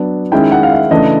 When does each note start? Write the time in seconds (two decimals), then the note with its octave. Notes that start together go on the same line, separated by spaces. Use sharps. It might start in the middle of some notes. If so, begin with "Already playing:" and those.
Already playing: F#3 B3 D4
0.32 D#3 G#3 C#4 E4 G5
0.52 F#5
0.63 F5
0.71 E5
0.91 C#3 E3 A3 D4 D#5